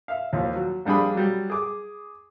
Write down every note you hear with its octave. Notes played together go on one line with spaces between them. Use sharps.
E5 F5
D#2 A#2 F3
F#3
A#1 G3 D4 G#4 B5
F#3 G3
G#4 D6